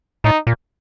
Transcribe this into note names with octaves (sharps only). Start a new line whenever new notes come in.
A2 D#4
A#2